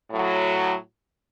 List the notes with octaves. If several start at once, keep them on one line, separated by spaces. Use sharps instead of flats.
A2 F#3